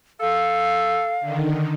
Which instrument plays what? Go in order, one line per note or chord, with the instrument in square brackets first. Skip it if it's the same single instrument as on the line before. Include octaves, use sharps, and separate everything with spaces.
[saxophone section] A4 [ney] F5
[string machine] D3 D#3